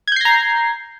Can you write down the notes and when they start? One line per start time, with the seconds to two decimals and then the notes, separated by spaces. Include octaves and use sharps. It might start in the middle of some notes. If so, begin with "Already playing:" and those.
0.08 G#6
0.12 G6
0.16 C7
0.21 A#6
0.25 A#5